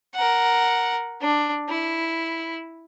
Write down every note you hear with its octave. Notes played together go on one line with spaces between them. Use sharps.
A#4 F#5
D4
E4